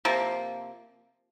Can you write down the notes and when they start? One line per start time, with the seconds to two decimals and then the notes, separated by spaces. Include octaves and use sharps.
0.05 C3 F3 A#3